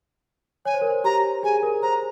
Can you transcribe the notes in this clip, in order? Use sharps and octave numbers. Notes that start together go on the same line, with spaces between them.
C#5 G#5
C5
A#4
C5
G4 A#5
G#4 G#5
A#4
C5 A#5